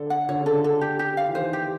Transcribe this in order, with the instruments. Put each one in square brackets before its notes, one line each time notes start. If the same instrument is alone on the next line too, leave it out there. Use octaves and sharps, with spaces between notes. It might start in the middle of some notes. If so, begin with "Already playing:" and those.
Already playing: [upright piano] D3 [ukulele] A4
[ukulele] F#5
[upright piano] D3 [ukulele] C#5
[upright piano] C#3
[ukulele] A4
[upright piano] D3
[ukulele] A4
G4
G4
F5
[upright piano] E3
[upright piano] D#3 [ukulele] C5
[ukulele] G4